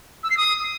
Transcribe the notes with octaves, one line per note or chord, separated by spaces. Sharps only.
E6
C7
D#6